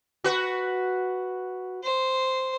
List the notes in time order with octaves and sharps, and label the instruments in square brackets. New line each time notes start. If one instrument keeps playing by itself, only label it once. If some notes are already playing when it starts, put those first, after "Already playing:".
[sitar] F#4 B4
[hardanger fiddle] C5